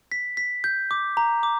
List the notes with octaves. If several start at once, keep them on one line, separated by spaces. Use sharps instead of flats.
B6
B6
G6
D6
A#5
D6